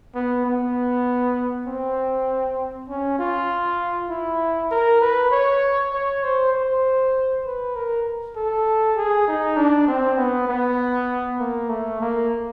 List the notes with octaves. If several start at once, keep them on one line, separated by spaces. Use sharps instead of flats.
B3
B3
C4
C#4
F4
E4
A#4
B4
C#5
C#5
C5
C5
B4
A#4
A4
G#4
D#4
D4
C4
B3
B3
A#3
A3
A#3